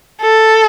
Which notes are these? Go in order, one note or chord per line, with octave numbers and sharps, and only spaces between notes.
A4